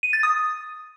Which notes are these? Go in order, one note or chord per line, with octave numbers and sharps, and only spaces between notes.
D#7
A6
D#6